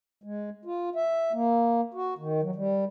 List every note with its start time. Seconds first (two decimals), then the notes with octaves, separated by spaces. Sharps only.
0.23 G#3
0.65 F4
0.95 E5
1.33 A#3
1.94 F#4
2.18 D#3
2.43 F#3
2.56 G3